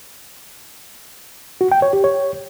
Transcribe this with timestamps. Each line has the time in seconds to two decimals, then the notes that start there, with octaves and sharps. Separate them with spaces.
1.61 F#4
1.72 G5
1.82 C#5
1.93 G4
2.04 C#5